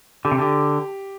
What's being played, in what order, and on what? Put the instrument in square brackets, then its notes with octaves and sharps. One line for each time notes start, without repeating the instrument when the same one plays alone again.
[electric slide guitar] D3 [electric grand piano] G4
[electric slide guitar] C3
[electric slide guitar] D3 [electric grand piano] G4